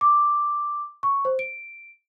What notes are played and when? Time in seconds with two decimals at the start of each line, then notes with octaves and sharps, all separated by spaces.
0.01 D6
1.03 C#6
1.25 C5
1.39 D7